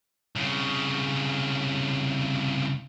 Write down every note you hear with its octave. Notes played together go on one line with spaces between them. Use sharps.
C2 C#3